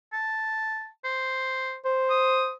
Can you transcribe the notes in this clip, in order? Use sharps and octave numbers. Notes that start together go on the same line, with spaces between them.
A5
C5
C5
D#6